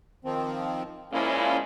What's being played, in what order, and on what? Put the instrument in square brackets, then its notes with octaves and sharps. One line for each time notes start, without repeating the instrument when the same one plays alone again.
[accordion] D#3 F3 C4
[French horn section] A#2 F3 G#3 [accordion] A#3 C#4 E4